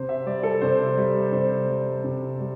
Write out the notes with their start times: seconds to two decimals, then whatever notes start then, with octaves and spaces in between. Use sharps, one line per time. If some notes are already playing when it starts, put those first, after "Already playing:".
Already playing: C3 C5
0.09 E5
0.26 G3 D5
0.43 A4
0.61 C3 C5
0.97 G3
1.33 C3 C5
1.68 G3
2.04 C3
2.40 G3